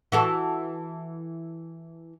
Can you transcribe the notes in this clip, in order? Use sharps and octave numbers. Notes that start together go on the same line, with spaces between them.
E3 F#4 A4